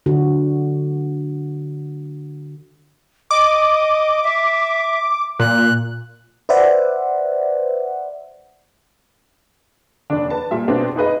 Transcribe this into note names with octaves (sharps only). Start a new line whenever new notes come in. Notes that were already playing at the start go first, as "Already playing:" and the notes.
D3 F#4
D#5 D6
E5
A#2 F#6
B4 C5 D5 E5 F#5
F1 D#2 D4 D5
B4 A5
A#2 G3 E5
B2 B3 C4 D4
D#4 G#4 B4 D#5